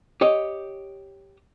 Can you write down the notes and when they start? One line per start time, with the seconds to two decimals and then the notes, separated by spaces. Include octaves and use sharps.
0.21 G4 C#5 D#5